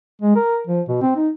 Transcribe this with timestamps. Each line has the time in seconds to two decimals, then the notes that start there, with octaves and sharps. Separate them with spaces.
0.21 G#3
0.35 A#4
0.67 F3
0.88 B2
1.02 C4
1.16 D#4